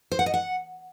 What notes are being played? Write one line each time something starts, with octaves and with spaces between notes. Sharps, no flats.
C5
F#5
D#5
F#5